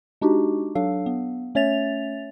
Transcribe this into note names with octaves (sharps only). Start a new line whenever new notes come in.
G#3 D4 D#4 F#4 G4
F#3 D4 A4 F5
B3
A3 C#4 C#5 E5 A6 F7